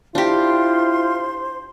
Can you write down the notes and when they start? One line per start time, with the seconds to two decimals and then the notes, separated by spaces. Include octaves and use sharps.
0.15 D4 E4 F4 G4 C5 C6